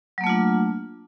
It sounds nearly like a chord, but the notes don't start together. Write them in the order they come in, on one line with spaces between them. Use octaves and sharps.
F#3 A#3 A3 F4 D4